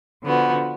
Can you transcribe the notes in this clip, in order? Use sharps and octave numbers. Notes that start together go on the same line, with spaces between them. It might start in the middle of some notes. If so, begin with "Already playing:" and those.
D3 F3 B3 F#4